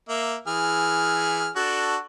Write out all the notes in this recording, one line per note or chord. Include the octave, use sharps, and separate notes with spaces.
A#3 E5
E3 G#4 F6
D4 F#4 A4